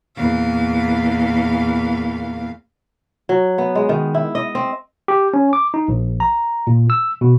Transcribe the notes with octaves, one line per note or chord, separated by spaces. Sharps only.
E2 A#2 F5
F#3
B3
G#3
D#3
E4
D#5
C4
G4
C#4
D6
D#4
A#1
A#5
A#2
E6
B2